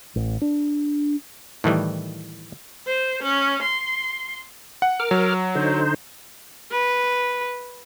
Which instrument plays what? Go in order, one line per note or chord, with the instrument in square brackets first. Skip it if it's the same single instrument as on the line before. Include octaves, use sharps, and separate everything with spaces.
[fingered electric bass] A1
D4
[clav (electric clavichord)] A2 D#3 E3 G3
[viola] C5
C#4
C6
[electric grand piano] F#5
[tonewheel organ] A#4 D6 F6
[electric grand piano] F#3
[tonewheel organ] D3 D#4 C5
[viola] B4